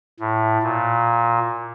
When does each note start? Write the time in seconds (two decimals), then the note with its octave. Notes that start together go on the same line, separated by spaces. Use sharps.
0.20 A2
0.63 A#2